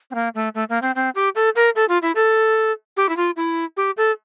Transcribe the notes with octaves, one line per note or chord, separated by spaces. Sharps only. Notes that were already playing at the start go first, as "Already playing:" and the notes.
C4
A#3
A3
A3
A#3
C4
C4
G4
A4
A#4
A4
F4
E4
A4
G4
E4
F4
E4
G4
A4